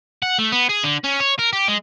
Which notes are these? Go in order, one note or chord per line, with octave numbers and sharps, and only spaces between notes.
F#5
A3
B3
G#4
D3
C#4
C#5
A#4
G4
G#3